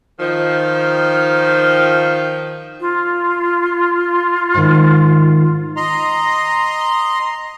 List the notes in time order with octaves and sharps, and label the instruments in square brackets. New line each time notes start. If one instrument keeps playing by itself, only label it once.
[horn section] D#3 F3
[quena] F4
[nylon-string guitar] G#2 D#3
[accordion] D#5 A#5 C6